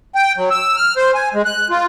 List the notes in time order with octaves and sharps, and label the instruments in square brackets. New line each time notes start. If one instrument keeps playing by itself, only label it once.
[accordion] G5
F#3
E6
F6
C5
G#5
G#3
F#6
F4